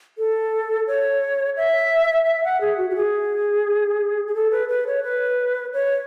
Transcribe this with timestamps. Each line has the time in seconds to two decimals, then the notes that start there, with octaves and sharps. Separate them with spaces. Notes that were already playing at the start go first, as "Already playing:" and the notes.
0.18 A4
0.87 C#5
1.57 E5
2.26 E5
2.44 F#5
2.61 G#4
2.78 F#4
2.90 F#4
2.96 G#4
4.27 G#4
4.35 A4
4.51 B4
4.69 B4
4.87 C#5
5.03 B4
5.74 C#5